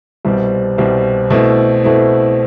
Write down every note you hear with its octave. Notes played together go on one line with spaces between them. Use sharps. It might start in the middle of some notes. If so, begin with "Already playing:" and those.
C2 B2 G3 C4
C2 B2 G3 C4
B2 A3 C4 E4
B2 A3 C4 E4